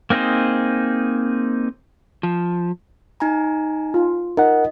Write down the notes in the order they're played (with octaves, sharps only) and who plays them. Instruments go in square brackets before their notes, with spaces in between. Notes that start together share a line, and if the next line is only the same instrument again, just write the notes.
[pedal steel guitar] A#3 C4 D#4 G#4 C5
[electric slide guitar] F3
[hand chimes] D#4 G#5 A#5
[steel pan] F4
[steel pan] D#4 [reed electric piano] A#4 F#5 [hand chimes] D#5